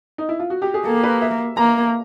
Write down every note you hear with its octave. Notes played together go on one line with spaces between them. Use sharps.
D#4
E4
F4
F#4
G4
G#4
A#3 A4
B4
E5
A#3 A#5